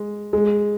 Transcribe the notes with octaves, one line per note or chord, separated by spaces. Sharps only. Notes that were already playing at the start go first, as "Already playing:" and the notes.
Already playing: G#3
G#3